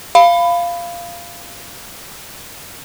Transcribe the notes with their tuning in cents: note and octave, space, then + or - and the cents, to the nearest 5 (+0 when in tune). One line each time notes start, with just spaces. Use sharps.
F5 -10 B5 +15